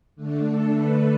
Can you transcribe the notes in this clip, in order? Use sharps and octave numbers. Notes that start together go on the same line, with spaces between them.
D3 A3 D4
A4
B4